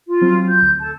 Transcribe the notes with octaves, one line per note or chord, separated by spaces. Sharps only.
F4
F#3 C4
G6
D2
A4 A5